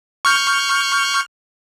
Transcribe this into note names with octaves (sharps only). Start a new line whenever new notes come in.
C#6 F6 G6